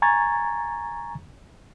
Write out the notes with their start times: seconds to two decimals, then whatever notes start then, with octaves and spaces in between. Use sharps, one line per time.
0.02 G#5 A#5 C#6 G#6 A6